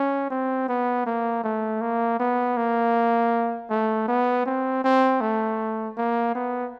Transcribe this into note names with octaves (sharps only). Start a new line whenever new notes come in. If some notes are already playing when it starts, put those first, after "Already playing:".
Already playing: C#4
C4
B3
A#3
A3
A#3
B3
A#3
A3
B3
C4
C4
A3
A#3
B3